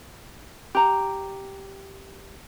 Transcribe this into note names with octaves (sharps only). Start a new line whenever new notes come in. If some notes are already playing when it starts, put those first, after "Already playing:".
G4 A#5